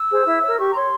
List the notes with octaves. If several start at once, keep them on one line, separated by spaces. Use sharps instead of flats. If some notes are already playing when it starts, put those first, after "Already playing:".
Already playing: E6
G#4 C5
E4
A#4 C#5
G4 C#6
A#5
C#5 C6